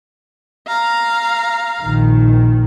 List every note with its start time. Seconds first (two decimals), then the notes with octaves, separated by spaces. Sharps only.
0.67 F5 A#5
1.80 A#1 D#3